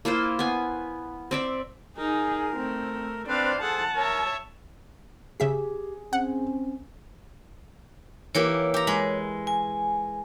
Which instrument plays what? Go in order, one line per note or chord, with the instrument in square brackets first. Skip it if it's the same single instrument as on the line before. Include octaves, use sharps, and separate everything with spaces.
[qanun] A#3 E4 F4 C5
B3 G#5
C4 D5 E5
[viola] D#4 [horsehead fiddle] G#4 [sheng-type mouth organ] A#4
[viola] A3 [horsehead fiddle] C4
[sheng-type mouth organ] C4 D4 B4 [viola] C5 F5 [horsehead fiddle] D5
[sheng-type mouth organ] G#4 A4 C5 [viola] F#5 [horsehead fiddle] A5
[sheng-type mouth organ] A#4 [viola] C#5 E5
[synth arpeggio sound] C#3 E5 B6 [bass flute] G4 [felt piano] G#4
[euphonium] C4 [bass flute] C#4 [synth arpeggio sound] F#5
[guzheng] E3 A#3 G4 [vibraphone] C#5
[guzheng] G4 A#5
G#3 B5
[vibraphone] G#5